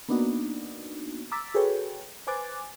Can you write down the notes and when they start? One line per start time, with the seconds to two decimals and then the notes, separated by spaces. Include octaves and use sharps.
0.08 A#3 B3 D4 D#4 F#4
1.32 A#5 D6 E6 A6 B6
1.54 F#4 G#4 A4 B4 C#5 G5
2.27 B4 C5 G#5 D6 F#6 A6